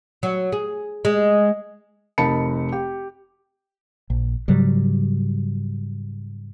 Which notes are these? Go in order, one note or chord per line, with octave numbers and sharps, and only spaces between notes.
F#3
G#4
G#3
F1 D#4 A#4 A5 B5 C#7
G4
A#1
G#2 C#3 F#3 G3